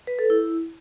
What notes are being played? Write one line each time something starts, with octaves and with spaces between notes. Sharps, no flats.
B4
A4
E4